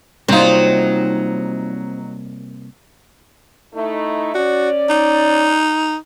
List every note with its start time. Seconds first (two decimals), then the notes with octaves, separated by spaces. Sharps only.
0.28 C3 F#3 G3 A#3 C4 D#4 F4
3.74 A3 D#4 E4
4.35 C#4 F#4 D5
4.90 D#4